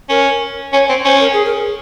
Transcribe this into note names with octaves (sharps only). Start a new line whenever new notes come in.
C#4 A#4
C#4 C#5
C4
C#4 C5
A#4
G#4
A#4